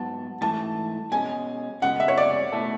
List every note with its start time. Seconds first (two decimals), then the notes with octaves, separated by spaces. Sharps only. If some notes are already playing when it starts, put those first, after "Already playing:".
Already playing: G#2 F#3 B3 A5
0.41 G#2 E3 A3 A5
1.11 B2 G#3 C#4 G#5
1.82 C#3 G#3 B3 F#5
2.00 E5
2.08 C#5
2.17 D5
2.52 B2 A3 E4 A4